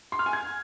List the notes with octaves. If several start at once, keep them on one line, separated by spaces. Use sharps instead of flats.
C6
F6
G#5
G#6